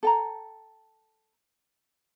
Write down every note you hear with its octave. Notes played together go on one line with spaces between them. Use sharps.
A4 G5 A#5